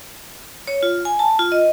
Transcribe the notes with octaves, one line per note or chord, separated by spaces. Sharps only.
C#5
F4
G#5
A5
F4
D#5